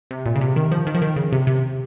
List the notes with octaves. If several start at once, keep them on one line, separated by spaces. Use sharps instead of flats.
C3
A#2
C#3
C3
D#3
F3
D#3
F3
D#3
C#3
C3
C3